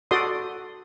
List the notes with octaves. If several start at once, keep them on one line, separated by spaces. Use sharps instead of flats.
F#4 A4 D5 C6 D#6